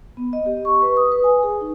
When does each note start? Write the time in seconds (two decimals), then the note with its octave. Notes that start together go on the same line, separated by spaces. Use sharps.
0.17 B3
0.33 D#5
0.46 G4
0.65 C#6
0.82 B4
0.97 D#6
1.12 B4
1.24 G#5
1.43 G#4
1.61 D#4